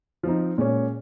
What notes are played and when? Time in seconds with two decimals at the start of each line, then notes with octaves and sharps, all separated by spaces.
0.23 F3 C4 D#4
0.58 A#2 G#3 C#4